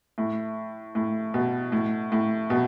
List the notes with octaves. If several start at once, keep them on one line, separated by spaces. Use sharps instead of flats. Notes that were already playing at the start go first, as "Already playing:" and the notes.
A2
A2
B2
A2
A2
B2